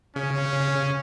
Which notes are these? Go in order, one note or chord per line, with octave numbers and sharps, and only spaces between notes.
C#3 C#4